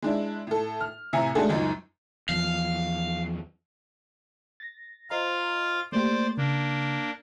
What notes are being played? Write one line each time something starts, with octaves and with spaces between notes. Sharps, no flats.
G#3 D4 E4
A2 A4
F6
A2 C3 E5 G#5 A#5 C#7
G#3 A3 D4 F#4 G#4 A4
F#1 C#2 F#2 D#4
E2 F3 F5
A6 A#6
F4 C5 D#5 F5 A#5
A3 A#3 G4 C5 D5
C#3 A#3 D4